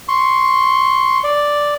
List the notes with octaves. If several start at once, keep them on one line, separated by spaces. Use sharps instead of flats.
C6 C#6
D5